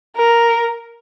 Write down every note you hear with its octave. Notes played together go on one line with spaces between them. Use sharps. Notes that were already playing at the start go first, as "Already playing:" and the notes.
A#4